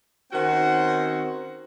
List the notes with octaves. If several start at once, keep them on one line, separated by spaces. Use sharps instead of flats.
D#3 C4 C#4 F#4 C5 F#5